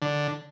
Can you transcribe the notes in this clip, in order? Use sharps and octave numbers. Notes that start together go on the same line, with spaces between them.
D3